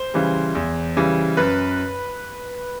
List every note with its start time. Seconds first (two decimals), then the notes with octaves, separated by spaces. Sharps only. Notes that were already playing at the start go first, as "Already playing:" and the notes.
Already playing: C5
0.14 C#3 E3 G3
0.55 E2
0.97 C#3 E3 G3
1.37 F#2 B4